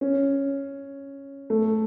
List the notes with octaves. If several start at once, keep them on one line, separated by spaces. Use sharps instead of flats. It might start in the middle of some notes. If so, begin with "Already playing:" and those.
C#4
A3